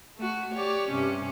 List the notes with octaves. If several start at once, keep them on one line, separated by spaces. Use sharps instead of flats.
A3 F#4
G4 C#5 D5
G2 C3 C#4